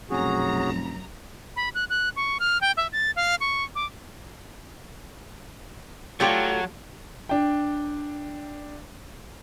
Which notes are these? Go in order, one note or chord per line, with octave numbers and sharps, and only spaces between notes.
F1 B1 F#2 C#4 F#4 G#4 A#5
B5
F#6
F#6
C#6
F6
G5
E5
A6
F5
C#6
D6
F#3 A3 F4 G4
D4 G5